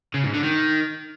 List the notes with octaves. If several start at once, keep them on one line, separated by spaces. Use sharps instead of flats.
C#3
G#2
D3
D#3